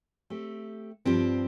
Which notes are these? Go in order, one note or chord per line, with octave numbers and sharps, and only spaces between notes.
A3 C4 G4
G2 F3 C4 G4